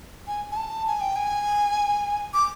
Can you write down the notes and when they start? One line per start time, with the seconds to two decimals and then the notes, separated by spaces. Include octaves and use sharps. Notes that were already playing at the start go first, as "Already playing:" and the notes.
0.27 G#5
0.51 G#5
0.56 A5
0.87 G#5
1.01 G5
1.16 G#5
2.34 D6